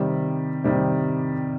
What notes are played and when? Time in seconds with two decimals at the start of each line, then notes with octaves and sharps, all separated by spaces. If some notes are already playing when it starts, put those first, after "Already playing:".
Already playing: C3 D#3 G3
0.64 C3 D#3 G3